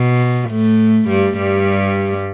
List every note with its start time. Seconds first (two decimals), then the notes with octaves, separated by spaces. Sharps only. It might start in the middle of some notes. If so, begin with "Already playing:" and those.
Already playing: B2
0.50 A2 A3
1.09 G2 G3
1.38 G2 G3